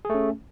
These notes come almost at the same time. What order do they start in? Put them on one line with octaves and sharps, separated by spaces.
G#4 A3 C#4